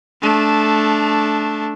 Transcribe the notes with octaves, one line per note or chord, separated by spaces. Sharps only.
A3 D4